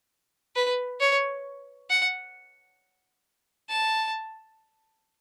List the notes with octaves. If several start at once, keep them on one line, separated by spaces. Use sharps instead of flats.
B4
C#5
F#5
A5